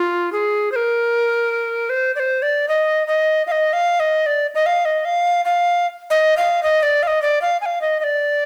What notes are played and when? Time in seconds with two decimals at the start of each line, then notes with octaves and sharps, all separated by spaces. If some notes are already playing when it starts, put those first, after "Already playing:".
Already playing: F4
0.32 G#4
0.72 C5
0.76 A#4
1.90 C5
2.16 D5
2.20 C5
2.42 D5
2.68 D#5
3.07 D#5
3.47 F5
3.52 D#5
3.73 F5
4.00 D#5
4.26 D5
4.55 D#5
4.66 F5
4.85 D#5
5.05 F5
5.45 F5
6.10 D#5
6.37 F5
6.63 D#5
6.83 D5
7.03 F5
7.07 D#5
7.22 D5
7.42 F5
7.61 G#5
7.66 F5
7.81 D#5
8.00 D#5
8.04 D5